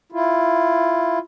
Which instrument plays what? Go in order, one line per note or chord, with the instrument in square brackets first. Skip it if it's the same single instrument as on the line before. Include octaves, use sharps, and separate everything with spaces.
[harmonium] E4 F4